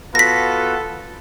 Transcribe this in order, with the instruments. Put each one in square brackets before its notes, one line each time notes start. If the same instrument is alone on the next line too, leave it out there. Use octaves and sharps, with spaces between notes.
[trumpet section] B3 F4 F#4 [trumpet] A4 [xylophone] A#6 B6